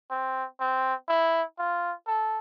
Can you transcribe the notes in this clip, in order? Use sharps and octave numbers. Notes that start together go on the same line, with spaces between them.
C4
C4
E4
F4
A4